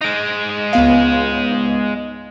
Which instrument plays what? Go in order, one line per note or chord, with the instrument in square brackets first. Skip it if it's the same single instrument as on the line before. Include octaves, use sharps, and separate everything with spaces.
[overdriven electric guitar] G#3 D#4 [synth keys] A#6 D7
[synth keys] C#2 B3 F5